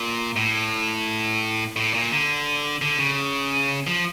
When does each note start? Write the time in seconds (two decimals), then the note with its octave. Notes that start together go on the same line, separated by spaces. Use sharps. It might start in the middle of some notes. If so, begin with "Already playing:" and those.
Already playing: A#2
0.36 A2
1.76 A2
1.94 A#2
2.12 D3
2.82 D3
2.99 C#3
3.87 F3